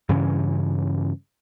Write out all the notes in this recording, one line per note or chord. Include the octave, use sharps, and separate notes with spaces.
G2 C#3 E3 C#4